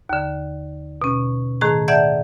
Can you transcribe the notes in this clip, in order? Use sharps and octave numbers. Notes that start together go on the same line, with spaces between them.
D#2 D3
B2 C#4
A2 D#3 A3 G#4 A#5
D5 E5 F#5 A5 G6 G#6